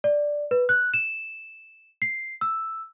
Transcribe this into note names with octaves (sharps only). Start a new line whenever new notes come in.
D5
B4
F#6
E7
C7
E6